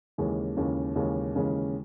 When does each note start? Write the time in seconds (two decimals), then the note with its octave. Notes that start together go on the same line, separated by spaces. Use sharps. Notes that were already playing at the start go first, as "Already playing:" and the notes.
0.18 D#2 C#3 E3 G#3 C#4
0.57 D#2 C#3 E3 G#3 C#4
0.96 D#2 C#3 E3 G#3 C#4
1.35 D#2 C#3 E3 G#3 C#4